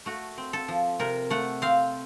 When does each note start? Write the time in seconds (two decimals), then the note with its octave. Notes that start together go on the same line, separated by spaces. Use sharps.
0.06 A3 F#4
0.38 C4
0.53 A4
0.68 F3
1.00 C3 A#4
1.30 A3 F#5
1.62 C4 F5